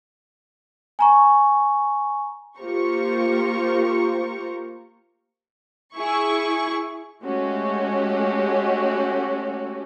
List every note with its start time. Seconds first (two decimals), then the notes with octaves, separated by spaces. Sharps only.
0.99 G#5 A#5 C#6
2.59 A#3 F4 G4 C5 A#5 C#6
5.97 E4 G#4 C#6
7.23 G#3 A3 C#4 F#4 G4